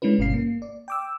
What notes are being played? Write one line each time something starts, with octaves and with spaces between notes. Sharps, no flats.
G#3 C#4 D4 E4 B4
G1 G2 B2 C#4 F5 C7
A#3
D5
G5 D6 E6